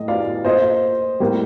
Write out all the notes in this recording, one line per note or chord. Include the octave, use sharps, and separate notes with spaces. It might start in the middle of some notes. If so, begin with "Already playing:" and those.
Already playing: A2 A3 D#5
D5 F5
A#2 A3 C5 D#5
A2 G3 A#3